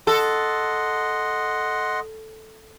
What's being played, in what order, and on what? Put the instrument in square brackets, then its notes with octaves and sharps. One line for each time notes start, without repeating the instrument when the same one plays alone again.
[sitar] A4 [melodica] D#5 F#5 C6